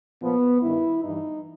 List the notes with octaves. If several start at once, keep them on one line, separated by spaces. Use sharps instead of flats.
A#2 F3 B3
G2 D#3 E4
G2 E3 D#4